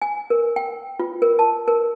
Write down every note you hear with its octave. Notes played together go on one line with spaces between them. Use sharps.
G#5
A#4
G5
F4
A#4
A5
A#4